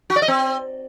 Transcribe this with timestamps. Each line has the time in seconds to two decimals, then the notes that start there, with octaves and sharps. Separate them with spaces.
0.10 F#4
0.16 D5
0.22 D#5
0.28 C4